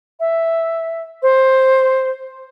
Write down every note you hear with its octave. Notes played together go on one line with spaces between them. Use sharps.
E5
C5